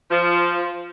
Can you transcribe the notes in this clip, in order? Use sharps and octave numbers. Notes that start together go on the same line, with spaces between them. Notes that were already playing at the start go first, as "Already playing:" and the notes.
F3